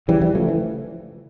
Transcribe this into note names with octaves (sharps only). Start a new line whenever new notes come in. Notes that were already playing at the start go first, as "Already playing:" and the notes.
C#3 E3 G3
E3 G3
C#3 F3 A3
E3